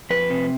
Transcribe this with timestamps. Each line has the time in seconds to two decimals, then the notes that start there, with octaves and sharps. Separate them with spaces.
0.10 F2 B4
0.30 C3